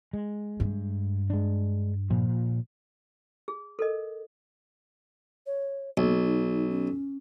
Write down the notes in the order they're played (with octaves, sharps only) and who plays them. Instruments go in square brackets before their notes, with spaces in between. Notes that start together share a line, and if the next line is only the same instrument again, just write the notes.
[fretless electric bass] G#3
[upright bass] G2
[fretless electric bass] G#3 D4
A#2 F3
[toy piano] G#4
A4 A#4 D#5
[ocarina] C#5
[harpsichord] B1 [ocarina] A#3
[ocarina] D#4
C#4